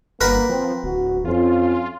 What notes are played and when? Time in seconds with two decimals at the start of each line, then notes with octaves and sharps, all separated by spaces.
0.21 G1 A#3 A#4 B4 F#5
0.49 F3 C4
0.84 D1 F#4
1.25 F2 C#4 F4